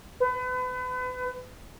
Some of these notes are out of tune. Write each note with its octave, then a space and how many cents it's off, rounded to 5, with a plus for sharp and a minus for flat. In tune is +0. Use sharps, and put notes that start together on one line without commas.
B4 +35